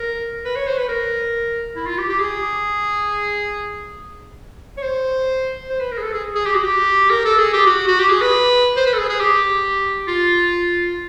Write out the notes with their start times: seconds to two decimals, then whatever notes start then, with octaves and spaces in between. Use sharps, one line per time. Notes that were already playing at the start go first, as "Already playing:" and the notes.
Already playing: A#4
0.45 B4
0.56 C#5
0.67 C5
0.78 B4
0.88 A#4
1.76 E4
1.86 F4
1.98 G4
2.09 G4
2.20 G#4
4.77 C#5
4.83 C5
5.69 C5
5.80 B4
5.91 A#4
5.97 G#4
6.03 A4
6.13 G#4
6.35 G#4
6.46 G4
6.55 F#4
6.63 G4
7.10 A#4
7.25 A4
7.39 G#4
7.53 G4
7.66 F#4
7.88 F#4
7.99 G4
8.10 G#4
8.21 B4
8.76 C5
8.86 B4
8.93 A4
8.98 G#4
9.09 G#4
9.20 G4
10.07 F4